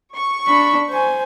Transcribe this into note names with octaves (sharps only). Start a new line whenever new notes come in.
C#6
D4 B5
C5 G#5